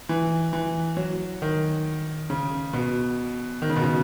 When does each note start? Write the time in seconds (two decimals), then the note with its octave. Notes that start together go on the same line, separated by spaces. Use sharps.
0.09 E3
0.53 E3
0.97 F#3
1.42 D#3
2.30 C#3
2.73 B2
3.62 D#3
3.70 C#3
3.76 B2
3.84 C#3